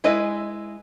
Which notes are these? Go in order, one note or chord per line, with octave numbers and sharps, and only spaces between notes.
G#3 E4 B4 D#5